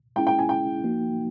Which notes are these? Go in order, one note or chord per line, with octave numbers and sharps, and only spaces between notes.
G#3 C#4 E4 G#4 G5
G5
G#5
G5
F3 A#3 D#4 F#4